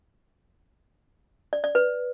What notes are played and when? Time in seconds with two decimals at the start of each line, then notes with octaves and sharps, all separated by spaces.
1.53 D5
1.64 D5
1.75 B4